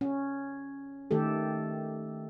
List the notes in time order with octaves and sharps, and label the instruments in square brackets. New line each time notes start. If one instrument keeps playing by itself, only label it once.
[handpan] C#4
D#3 A3 G4 A4